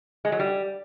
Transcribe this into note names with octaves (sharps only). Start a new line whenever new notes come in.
G#3
F#3
G3